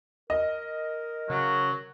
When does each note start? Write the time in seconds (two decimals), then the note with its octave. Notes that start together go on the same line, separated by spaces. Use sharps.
0.30 A#4 D#5
1.30 C#3 F#3